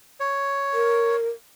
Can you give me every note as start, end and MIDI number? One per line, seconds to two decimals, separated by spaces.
0.20 1.16 73
0.74 1.29 70